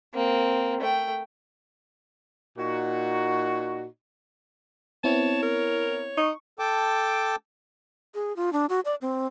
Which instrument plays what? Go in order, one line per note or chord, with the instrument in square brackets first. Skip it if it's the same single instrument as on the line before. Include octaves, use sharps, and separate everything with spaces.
[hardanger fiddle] A#3 C4
A3 G5
[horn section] A#2 D#4 F#4
[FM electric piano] B3 C4 E4 [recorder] C#5 [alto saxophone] A5
[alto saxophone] A#4
[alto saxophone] D#4 [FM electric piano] C#6
[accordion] A4 G5 A5 D6
[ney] G#4
F4
D4
F#4
D5
C4